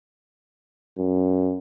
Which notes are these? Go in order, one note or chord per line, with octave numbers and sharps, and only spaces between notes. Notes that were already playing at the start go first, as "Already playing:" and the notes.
F#2